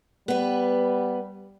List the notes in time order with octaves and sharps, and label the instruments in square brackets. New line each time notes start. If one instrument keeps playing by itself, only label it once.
[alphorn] G3 [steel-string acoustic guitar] B3 B4